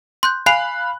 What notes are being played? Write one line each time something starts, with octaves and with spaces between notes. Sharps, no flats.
C6 F#6 G6
F5 G#5 B5 F#6 C7 F7